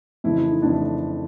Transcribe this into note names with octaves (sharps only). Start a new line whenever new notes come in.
F2 C#3 E3 A3 E4
E4
D#4
F2 C#3 E3 A3 D4
E4